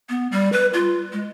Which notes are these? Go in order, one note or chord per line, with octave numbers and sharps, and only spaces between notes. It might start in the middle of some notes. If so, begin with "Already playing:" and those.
B3
G3
B4
F4
G#3